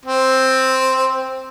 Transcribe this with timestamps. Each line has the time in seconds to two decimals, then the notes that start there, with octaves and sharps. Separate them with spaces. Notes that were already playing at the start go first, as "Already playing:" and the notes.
0.05 C4